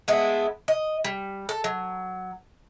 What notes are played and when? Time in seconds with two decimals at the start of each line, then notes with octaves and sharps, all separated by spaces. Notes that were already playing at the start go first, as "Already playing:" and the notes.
0.08 G#3 A3 B3 E4
0.68 D#5
1.04 G3
1.49 A4
1.64 F#3